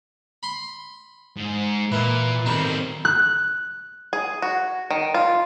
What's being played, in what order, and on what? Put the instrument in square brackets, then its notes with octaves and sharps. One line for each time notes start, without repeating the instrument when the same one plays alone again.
[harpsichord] B5 C6
[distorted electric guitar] G#2
[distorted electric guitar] A#2 [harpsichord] E3 A#4
[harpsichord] D#3 G3 C#6 [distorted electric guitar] F#3 C4
[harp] F#6
[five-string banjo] G#4
F#4
D#3
F4